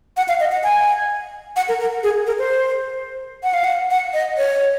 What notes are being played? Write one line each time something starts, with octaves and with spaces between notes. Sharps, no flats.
F#5
F5
D#5
F#5
G#5
F#5
A#4
A#4
G#4
A#4
C5
F#5
F5
F#5
F#5
D#5
C#5